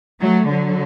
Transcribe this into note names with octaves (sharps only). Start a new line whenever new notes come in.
F#3 A3
D3 F#3